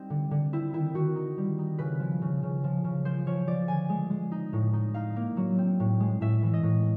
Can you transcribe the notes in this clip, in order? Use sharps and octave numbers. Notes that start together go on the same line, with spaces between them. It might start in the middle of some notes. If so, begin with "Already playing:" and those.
Already playing: G3 C4 D#4
D3
D3
C4 E4
D#3 E4
D#3 F#4
D#4
G3
D#4
C#3 B4
F3
C#3
C#3
F3
C#3
F3 C5
F3 C#5
F3 D5
D3 G#5
G#3
G#3
D#4
A2
D#4
D#4 F5
A#3
F#3
C4
A2
G#3
A2 E5
E3
D#5
A2